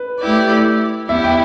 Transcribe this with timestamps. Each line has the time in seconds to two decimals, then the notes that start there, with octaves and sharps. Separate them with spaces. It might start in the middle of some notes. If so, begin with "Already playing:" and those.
Already playing: B4
0.20 A3 E4 G4 D5
1.09 B3 E4 G4 E5
1.24 G5